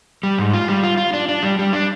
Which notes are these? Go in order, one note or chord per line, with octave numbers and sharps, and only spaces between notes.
G3
G#2
F4
G3
F4
F4
D4
D4
G3
G3
D4